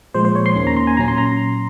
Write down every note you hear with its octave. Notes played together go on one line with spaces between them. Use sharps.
A#2 F3 G#3 C5
C5
C#5
C6
D#2 D#3 A#3 C#4
A#5
C6
G#5
A#2 F#3 C#4 A#5
C6
A#5